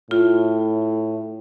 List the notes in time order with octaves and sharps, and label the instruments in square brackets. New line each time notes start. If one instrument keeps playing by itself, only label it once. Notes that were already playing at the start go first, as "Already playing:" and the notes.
[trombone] A2 [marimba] F4